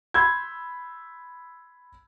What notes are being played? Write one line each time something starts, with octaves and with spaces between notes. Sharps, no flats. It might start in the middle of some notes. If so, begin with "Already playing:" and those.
B5 C6 E6 G6 G#6